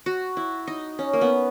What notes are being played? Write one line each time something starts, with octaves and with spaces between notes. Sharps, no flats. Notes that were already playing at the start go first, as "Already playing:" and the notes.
F#4
E4
D#4
C#4
A#3
B3